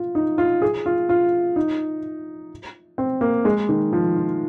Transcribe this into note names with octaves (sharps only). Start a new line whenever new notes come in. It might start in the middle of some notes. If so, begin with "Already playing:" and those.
Already playing: F4
D#4
F4
G#4
F4
F4
D#4
C4
A#3
G#3
D#3
F3
F4